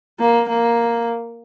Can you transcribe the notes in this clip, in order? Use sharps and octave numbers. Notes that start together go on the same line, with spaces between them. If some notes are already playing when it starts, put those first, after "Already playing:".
A#3
A#3